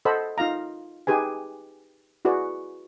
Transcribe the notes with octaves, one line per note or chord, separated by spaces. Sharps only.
A4 C5 D#5 F#5 B5 E6
D#4 F4 F5 A#5
D#4 G4 G#4 B4 G#5
E4 F#4 G#4 B4 D5